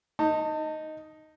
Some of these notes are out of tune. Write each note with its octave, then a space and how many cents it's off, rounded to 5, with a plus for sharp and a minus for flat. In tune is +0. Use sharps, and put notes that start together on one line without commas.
D#4 +0 A5 +35